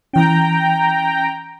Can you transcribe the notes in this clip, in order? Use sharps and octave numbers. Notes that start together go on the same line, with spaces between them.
E3 C#4 G5 A#5